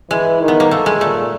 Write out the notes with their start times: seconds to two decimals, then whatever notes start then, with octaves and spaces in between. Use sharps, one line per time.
0.10 E3 G#3
0.41 D#3
0.48 B3
0.60 A#3
0.71 A3
0.86 G#3
1.01 A#2 A3